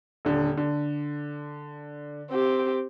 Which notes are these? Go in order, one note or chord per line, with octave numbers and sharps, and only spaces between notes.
D#1 D3
D3
C4 G4